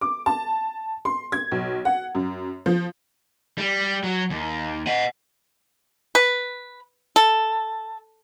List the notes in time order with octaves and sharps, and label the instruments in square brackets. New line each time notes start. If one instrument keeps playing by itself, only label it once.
[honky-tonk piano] D6
A5
C6
G#6
B1
F#5
F#2
F3
[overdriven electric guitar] G3
F#3
D#2
D#5 F#5
[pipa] B4
A4